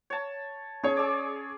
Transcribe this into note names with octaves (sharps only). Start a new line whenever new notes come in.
C#5 A5
C#4 G#4 C#5
G#4 D5